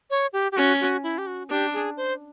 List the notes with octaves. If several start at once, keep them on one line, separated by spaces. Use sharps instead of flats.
C#5
G4
G4
C#4 F#4
F#4
E4
G4
F#4
D4 G4
G#4
C5